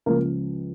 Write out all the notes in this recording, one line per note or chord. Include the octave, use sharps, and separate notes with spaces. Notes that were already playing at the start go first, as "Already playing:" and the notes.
C#2 C#3 F3 A#3